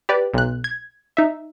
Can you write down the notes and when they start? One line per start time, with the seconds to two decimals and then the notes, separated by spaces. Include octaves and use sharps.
0.09 G4 B4 D5
0.34 B1 F#6
0.64 G#6
1.17 D#4 E5